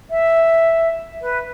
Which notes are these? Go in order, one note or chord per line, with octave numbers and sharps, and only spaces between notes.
E5
B4